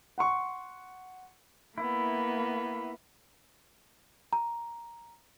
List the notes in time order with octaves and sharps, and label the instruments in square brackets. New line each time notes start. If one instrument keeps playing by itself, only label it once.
[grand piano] F#5 C6 C#6
[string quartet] A#3 B3 [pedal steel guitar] E4
[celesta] A#5